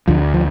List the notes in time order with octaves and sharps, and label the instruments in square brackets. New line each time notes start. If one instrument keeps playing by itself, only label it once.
[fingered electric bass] D2 D3 F3
F3